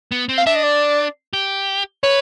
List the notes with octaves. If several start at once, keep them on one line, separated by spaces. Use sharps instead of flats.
B3
C4
F5
D4 E5
D#5
D5
G4
B4 C#5